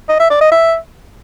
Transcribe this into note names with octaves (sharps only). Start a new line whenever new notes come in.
D#5
E5
D5
D#5
E5